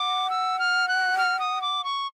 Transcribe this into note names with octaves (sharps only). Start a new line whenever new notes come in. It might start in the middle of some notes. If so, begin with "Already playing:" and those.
Already playing: F#5 D6
E6
F6
F#6
F6
D#6
D6
C#6